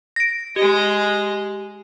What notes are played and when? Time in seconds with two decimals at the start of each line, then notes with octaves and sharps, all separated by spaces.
0.16 A#6 D7
0.56 G#3 G4 D#5